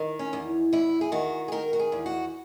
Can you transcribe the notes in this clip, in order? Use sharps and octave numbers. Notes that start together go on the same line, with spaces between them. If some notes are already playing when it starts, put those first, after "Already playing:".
Already playing: D#3
C#4
E2
E2 E4
G#4
D#3 F#4
G#4
D#3 A#4
F#4
G#4
E2
F#4